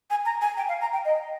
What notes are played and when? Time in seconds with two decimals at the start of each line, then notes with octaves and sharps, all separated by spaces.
0.10 G#5
0.25 A#5
0.41 G#5
0.57 G5
0.69 F5
0.81 A#5
0.93 G5
1.05 D#5